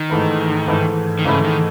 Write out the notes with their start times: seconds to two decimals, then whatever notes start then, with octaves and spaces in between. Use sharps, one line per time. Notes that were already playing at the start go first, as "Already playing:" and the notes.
Already playing: D#3
0.10 G#2 E3 A3 E4 B4
0.68 G#2 E3 A3 E4 B4
1.19 D#3
1.24 G#2 C#3 E3 A3 E4 B4
1.44 D#3